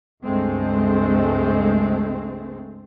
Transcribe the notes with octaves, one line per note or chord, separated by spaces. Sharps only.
C#2 G2 G#3 A3 C4